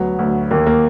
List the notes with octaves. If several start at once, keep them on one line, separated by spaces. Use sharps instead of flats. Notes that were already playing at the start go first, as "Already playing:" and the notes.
Already playing: D2 F#3 B3
D2
D#2 A#3
A#3